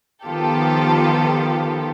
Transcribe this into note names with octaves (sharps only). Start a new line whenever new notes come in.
D#3 F3 B3 F4 G4 A4